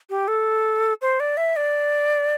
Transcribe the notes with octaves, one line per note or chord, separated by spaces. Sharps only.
G4
A4
C5
D5
E5
D5